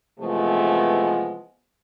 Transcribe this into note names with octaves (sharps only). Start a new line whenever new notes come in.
C3 E3 F3 G#3 A3 B3